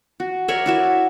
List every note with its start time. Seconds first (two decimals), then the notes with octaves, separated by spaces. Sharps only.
0.20 F#4
0.48 A#4 C#5 D5 E5
0.66 E4 F#4 E5